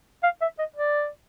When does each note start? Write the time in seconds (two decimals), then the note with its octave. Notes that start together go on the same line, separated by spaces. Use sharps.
0.23 F5
0.41 E5
0.59 D#5
0.76 D5